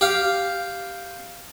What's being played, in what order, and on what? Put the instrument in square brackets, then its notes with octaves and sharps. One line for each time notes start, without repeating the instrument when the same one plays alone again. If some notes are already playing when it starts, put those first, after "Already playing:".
[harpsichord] G4 F5